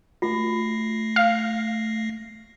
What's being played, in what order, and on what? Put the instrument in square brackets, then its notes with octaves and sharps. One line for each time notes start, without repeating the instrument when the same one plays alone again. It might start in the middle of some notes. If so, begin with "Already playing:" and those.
[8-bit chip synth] A3 A#6 C7 [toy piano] F4
[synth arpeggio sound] F5